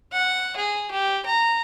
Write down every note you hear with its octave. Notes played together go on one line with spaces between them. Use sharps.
F#5
G#4
G4
A#5